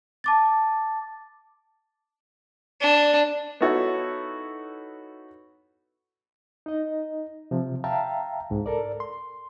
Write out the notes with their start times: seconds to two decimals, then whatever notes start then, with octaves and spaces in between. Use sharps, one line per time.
0.24 A5 D6 A6
2.81 D4
3.61 B3 D#4 E4 F#4 A4 C#5
6.66 D#4 D#5
7.51 C3 F3
7.84 E5 F5 G5 A5 A#5
8.50 C2 G#2
8.66 A4 A#4 D5
9.00 C6